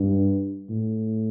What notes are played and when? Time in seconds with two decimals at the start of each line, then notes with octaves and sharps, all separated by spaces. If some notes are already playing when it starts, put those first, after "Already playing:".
Already playing: G2
0.69 A2